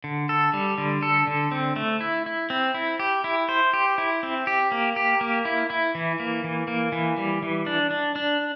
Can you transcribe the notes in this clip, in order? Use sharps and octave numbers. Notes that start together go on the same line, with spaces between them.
D3
A4
G3
D3
A4
D3
C4
A3
E4
E4
C4
E4
G4
E4
C5
G4
E4
C4
G4
A#3
G4
A#3
E4
E4
E3
A#3
E3
A#3
E3
G3
E3
D4
D4
D4